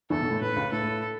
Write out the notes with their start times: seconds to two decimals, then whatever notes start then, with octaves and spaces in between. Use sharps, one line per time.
0.10 E2 E3 A4
0.21 B1 B2
0.31 A2
0.41 A2 B4
0.56 C#2 C#3
0.72 A2 A4